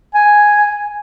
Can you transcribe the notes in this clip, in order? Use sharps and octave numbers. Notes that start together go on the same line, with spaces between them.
G#5